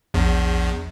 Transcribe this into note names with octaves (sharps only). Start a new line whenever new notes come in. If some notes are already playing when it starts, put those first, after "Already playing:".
A#1 E2